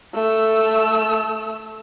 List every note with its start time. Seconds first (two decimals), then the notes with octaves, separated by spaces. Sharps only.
0.15 A3 E6